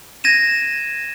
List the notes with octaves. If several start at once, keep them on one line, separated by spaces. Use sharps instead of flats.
G#6 A#6 D#7 E7